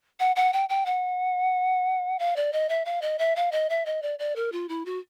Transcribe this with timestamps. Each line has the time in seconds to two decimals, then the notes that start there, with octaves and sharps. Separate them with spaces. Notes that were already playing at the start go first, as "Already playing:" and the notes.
0.20 F#5
0.36 F#5
0.53 G5
0.69 G5
0.86 F#5
2.19 F5
2.36 D5
2.53 D#5
2.69 E5
2.85 F5
3.02 D#5
3.19 E5
3.36 F5
3.52 D#5
3.70 E5
3.86 D#5
4.02 D5
4.19 D5
4.36 A#4
4.52 F4
4.69 E4
4.86 F#4